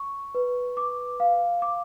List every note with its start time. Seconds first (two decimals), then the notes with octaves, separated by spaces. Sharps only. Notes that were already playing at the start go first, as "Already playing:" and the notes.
Already playing: C#6
0.35 B4
0.77 D6
1.20 F5
1.62 D6